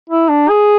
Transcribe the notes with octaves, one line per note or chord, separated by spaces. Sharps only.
E4
D4
G#4